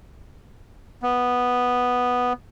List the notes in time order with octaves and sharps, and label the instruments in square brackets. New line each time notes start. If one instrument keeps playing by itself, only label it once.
[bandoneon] B3